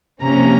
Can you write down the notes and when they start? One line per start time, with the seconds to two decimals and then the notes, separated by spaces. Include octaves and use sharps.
0.22 C3 F3 A#3 C#4 A#5